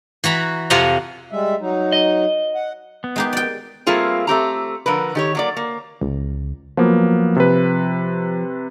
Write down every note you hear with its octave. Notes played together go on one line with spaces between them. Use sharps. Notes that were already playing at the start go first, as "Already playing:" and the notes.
E3 F#4 A#5 B5
F2 C3 F3 F5 F#5 A#5
G3 G#3 E5
F#3 D#4
D#5
F#5
B3
G#3 D#4 G4
D5 G5
G3 A3 A#3 C4 F4 G#4
A3 C4 G4 A#5
D3 F3 A#4 B4
D#3 G4 C#5
F#3 A#3 D5
A#3
C#2
F3 F#3 A#3 B3
C3 B4